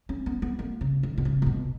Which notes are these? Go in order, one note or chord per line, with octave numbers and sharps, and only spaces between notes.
C#4
B3
B3
A#3
C#3
D#3
B2
C#3
C#3
B2